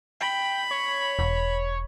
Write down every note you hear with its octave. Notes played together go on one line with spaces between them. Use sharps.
G5 B5
C#5
E1